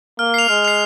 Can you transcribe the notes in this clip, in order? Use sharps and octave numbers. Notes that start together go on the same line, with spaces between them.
A#3 F6
C7 F7
G#3 F6
C7 F7